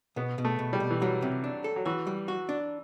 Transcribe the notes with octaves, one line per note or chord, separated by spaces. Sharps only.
B2 B3
B2
A3
B2
G3
B2
E3
F#3 G3
C3
D4
A4
F#3
E3 F#4
G3
F#4
D4